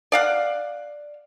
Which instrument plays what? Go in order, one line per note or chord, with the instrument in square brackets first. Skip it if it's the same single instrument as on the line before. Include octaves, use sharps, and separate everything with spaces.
[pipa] D5 F5 F#5